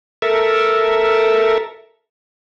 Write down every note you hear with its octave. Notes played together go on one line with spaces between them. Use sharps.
A4 A#4 E5